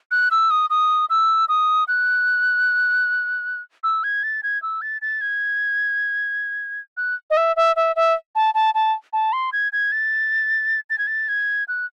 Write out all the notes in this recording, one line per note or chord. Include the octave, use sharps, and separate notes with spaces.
F#6
E6
D#6
D#6
E6
D#6
F#6
E6
G#6
A6
G#6
E6
A6
A6
G#6
F#6
D#5
E5
E5
E5
E5
A5
A5
A5
A5
C6
G#6
G#6
A6
A6
G#6
A6
G#6
F#6